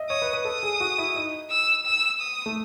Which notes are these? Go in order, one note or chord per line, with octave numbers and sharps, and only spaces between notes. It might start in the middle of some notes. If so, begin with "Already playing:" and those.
Already playing: D#5 E5
C#5 D#6
B4
B4
A4 D#6
G#4
F#4
E4
D#4
E6
E6
D#6
A3